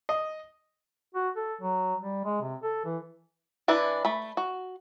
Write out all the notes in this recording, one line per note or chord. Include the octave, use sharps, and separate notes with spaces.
D#5
F#4
A4
F#3
G3
G#3
C3
A4
E3
E3 D4 E4 B4
A3 B5
F#4